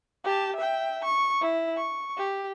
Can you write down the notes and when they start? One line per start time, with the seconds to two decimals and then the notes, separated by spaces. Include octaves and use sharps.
0.24 G4 A5
0.56 E5 G5
1.04 C#6
1.41 E4
1.77 C#6
2.17 G4